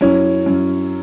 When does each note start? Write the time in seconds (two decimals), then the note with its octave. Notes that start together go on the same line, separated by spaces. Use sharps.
0.01 F#2 C#4 E4
0.46 F#2